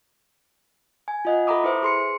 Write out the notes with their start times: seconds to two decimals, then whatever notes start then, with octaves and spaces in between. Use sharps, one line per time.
1.08 G#5
1.25 F4 D#5 F#5
1.47 A4 E5 A#5 B5 D6 D#6
1.64 E4 B4 C5 E5
1.83 G#4 C6 C#7